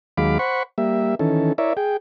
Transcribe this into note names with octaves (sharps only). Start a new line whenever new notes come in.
D#2 F#3 G#3 F5 B5 D6
C5 F#5 B5 C#6
G3 A#3 E5
D#3 E3 C#4 A4
E4 A#4 C#5 D5 E5
G#4 G5